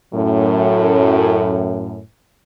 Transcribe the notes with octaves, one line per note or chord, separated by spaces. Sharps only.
F#2 A2